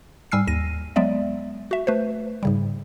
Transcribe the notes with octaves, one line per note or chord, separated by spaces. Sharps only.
G#2 G3 G#5 E6 F6 C7
D#2 A#6 D#7
F#3 G#3 B3 D5 E5
F#4 E5
A3 B4 C5
G#2 C#3 G3